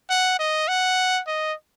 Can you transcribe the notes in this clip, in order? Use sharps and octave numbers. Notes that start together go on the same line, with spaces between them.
F#5
D#5
F#5
D#5